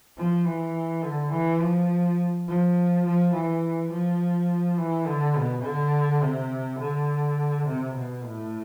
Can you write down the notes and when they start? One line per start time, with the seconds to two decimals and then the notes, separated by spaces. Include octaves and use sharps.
0.17 F3
0.45 E3
1.03 D3
1.31 E3
1.61 F3
2.48 F3
3.06 F3
3.33 E3
3.91 F3
4.77 E3
5.06 D3
5.36 B2
5.64 D3
6.22 C3
6.79 D3
7.67 C3
7.95 B2
8.24 A2